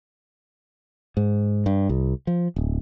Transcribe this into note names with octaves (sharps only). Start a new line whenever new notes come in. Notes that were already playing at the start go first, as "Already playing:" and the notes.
G#2
G2
C2
F3
D1